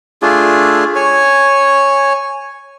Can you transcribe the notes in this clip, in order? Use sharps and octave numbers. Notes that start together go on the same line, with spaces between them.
A3 D4 F4 G#4
C#5 G#5